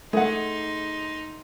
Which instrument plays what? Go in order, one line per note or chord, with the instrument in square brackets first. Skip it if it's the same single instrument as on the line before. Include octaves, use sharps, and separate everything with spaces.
[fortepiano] A3 [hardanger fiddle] D#4 C6 [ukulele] G#4 F#5